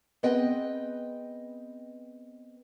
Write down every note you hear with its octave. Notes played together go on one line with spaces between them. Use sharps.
B3 C4 G#4 B4 D#5 G5